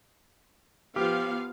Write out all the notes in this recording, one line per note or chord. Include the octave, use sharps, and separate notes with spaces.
F3 B3 G4 F5